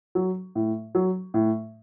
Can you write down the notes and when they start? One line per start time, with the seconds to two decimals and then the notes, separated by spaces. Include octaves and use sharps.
0.15 F#3
0.55 A2
0.95 F#3
1.34 A2